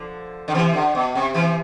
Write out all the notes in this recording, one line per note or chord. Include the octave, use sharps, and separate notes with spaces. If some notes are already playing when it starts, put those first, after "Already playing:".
Already playing: D3 F3
D3
C3 E3
D3
B2
C3
C3 E3